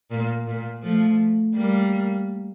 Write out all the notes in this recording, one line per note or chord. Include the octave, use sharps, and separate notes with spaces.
A#2
A#2
F3 A3
G3 A#3